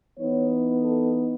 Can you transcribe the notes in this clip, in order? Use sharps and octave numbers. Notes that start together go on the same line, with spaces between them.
E3 B3 D#4 C#5
A4